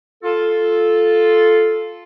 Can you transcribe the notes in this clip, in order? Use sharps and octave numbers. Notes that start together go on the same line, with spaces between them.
F4 A4